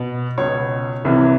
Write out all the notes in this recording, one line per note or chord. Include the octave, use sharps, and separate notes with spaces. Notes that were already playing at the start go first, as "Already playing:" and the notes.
Already playing: B2
C#2 B2 C#5
C2 C3 E3